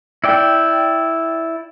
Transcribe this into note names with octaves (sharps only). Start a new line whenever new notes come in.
E4 D5 G5